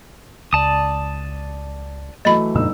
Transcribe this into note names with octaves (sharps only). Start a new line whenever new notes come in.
C#2 D5 A5 D#6
E3 F#3 A3 D#5 B5
G1 F2 A#2 C#3 D#4 E6